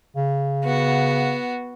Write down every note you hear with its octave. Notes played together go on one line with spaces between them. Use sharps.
C#3
B3 F#4